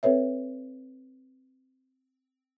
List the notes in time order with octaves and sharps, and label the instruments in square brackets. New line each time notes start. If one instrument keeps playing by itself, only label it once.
[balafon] C4 A4 B4 C#5 E5